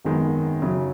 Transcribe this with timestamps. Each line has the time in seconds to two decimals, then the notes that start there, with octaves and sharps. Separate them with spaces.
0.05 G#1 F#2 D#3 G#3 B3
0.62 F#2 C#3 F#3